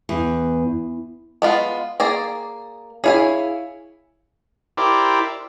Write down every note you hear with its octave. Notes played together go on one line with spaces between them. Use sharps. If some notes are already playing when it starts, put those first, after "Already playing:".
E2
G#3 B3 F4
A#3 G#4 D5
E4 G#4 C#5 F5 G#5
E4 G4 A#4 C5 D5